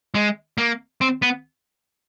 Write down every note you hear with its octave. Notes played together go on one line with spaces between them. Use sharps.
G#3
A#3
C4
B3